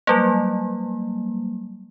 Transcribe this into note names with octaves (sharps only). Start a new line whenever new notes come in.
F#3 G3 A#3